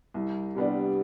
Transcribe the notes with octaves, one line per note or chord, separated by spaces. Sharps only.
C2
C3 G3 B3 D4